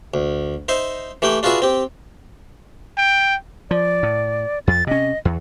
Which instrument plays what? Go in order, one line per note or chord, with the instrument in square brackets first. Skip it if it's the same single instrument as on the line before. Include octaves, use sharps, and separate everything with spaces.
[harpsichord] D2
D#4 C5 E5
E3 A3 G4 F#5 G5
D4 F4 F#4 G#4 B4 E5
C4 G4
[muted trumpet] G5
[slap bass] F3 [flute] D5
[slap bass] A2
[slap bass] F2 [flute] A6
[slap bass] C3 C#4 [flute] D#5
[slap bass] E2